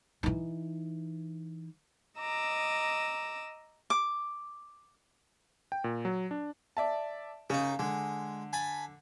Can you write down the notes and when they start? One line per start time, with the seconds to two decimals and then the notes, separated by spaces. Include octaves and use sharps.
0.23 E3 D#4
2.19 D#5 A#5 D6 E6
3.90 D6
5.72 G5
5.84 A#2
6.05 F#3
6.31 D4
6.77 D5 E5 A5
7.50 C#3 A#3 D#4
7.79 D3 G#3
8.53 G#5 A5 B5